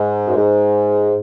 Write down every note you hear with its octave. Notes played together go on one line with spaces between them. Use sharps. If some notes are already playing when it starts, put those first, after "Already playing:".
Already playing: G#2
F#2
G#2